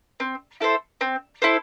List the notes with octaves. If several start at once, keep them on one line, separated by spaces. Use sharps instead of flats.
C4
E4 A4 C5
C4
E4 A4 C5